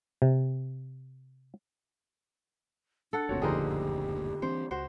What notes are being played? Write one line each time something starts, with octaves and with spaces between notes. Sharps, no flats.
C3
D4 A4 F#5
F#1 D2 A#2 C4 F#4 C#5
F2 D3 D#4 G4 G#4 A#4 C5
E3 C4 D4 C5
C#2 F#4 C5